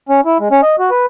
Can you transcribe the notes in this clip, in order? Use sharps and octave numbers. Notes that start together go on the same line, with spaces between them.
C#4
E4
G#3
C#4
D#5
F#4
B4